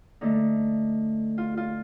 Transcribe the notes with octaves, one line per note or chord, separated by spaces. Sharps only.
D3 A3 D#4
F4
F4